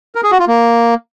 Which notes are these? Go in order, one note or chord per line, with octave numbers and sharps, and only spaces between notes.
A#4
G#4
F#4
F4
A#3